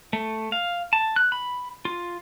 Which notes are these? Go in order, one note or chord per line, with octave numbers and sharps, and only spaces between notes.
A3
F5
A5
F#6
B5
F4